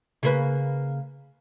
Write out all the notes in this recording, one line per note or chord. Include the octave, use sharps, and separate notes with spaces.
C#3 A#3 B4